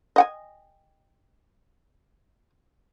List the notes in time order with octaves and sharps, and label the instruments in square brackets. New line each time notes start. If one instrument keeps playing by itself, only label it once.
[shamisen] D#5 F#5 G#5